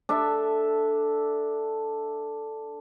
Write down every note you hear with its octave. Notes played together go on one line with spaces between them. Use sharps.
D4 A4 E5